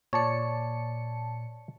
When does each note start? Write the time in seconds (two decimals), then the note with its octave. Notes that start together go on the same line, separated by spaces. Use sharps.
0.13 A#2 C#5 D5 A5 C#7